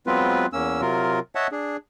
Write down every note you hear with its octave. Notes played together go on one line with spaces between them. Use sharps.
F#3 G#3 B3 C4 F4 B4
E2 A#3 C#4 E6
C3 F#3 F4 A#4
C#5 D#5 E5 F#5 A5
D4 G#4